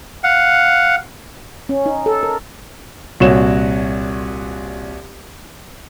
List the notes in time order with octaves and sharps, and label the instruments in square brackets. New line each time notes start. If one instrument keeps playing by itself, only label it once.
[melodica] F5 F#5
[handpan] C#4
D#4
A4
A#4
[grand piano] C2 A#2 F#4 C#5 E7